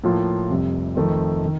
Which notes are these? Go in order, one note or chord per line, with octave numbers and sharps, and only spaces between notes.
A2 F3 A#3 F4
F1 F2 C3 G3
F2 D#3 A3 C4
D#3